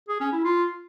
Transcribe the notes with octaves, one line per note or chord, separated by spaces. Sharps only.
G#4
C#4
E4
F4